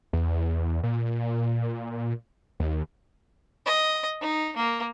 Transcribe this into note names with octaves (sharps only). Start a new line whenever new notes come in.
E2
A#2
D#2
D#5
D#4
A#3